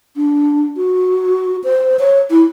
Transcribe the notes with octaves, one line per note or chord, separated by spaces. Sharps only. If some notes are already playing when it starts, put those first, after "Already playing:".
D4
F#4
C5
C#5
E4